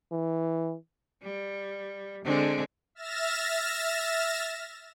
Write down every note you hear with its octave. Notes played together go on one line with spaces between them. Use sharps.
E3
G3
D3 G#3 C4
E5 F6 A6 A#6 E7